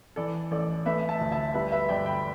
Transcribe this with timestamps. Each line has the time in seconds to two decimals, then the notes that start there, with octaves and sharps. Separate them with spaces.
0.16 E3 A4 D5
0.51 A1 A4 D5
0.85 A3 B4 E5
1.09 E5 A5
1.21 D2
1.32 E5 A5
1.54 G3 B4 E5
1.72 B4 E5
1.89 G1 D5 G5
2.06 G5 B5